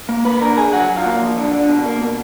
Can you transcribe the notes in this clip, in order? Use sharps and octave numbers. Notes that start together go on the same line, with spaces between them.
A#3
A#3 B4 B5
D3 A#4 A#5
D3 G#4 G#5
F#3 F#4 F#5
F#3
F4 F5
A#3
F3
D3
D3
B2
A#3
B2